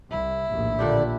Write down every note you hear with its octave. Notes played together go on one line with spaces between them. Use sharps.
C2 E4
A#1 D#2 A2
A#2 D3 D4 G4 D5